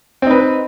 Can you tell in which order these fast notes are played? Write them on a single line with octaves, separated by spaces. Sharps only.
C4 D#4 B4